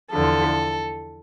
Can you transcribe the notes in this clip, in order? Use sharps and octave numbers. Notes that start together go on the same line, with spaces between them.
E2 D3 F3 A4